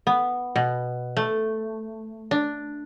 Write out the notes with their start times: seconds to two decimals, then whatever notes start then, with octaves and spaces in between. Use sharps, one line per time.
0.07 B3
0.56 B2
1.17 A3
2.31 D4